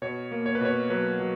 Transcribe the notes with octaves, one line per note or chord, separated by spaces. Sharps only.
B2 C#5
A#3
C#5
B4
B2 C#5
F#3 B4
F#3